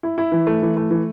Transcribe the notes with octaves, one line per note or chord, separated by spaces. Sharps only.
E4
E4
E3
A3
E3
A3
E3